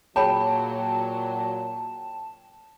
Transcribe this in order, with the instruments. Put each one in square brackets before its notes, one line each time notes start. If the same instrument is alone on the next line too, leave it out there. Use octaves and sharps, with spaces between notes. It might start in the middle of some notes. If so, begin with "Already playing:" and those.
[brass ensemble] A#2 F#3 [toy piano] G#4 C#5 B5 [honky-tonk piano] G5 [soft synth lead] A5